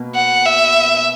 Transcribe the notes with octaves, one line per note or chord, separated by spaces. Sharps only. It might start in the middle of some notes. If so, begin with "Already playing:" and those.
Already playing: B2 A#3
F#5
E5